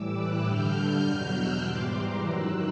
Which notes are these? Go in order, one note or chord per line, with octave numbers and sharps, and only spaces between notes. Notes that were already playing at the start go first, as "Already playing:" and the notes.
Already playing: A2 E3 G3 D6 E6
E6 F#6
G2 D3 G3 F6 G6
E2 B2 F#3
E6 F#6
G#2 E3 G3 C6 D6
A#5 C6
F#2 D#3 F#3 E6 F#6